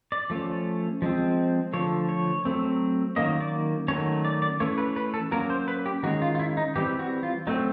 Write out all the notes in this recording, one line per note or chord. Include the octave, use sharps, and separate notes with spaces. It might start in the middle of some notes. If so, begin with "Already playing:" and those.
D5
F3 A3 C#4
F3 G#3 C4
D3 F3 A3 C#5
C#5
F#3 A3 C4
D#3 F#3 A#3 C#4 D#5
D5
D#3 F#3 A3 C#4 C#5
D5
D5
E3 A3 C#4 C#5
B4
B4
A4
F#3 A#3 C#4 A#4
C5
B4
G4
D#3 G#3 C#4 F#4
F4
F4
E4
D#4
E3 G3 C4 G4
F#4
F4
F#3 A3 C4 D#4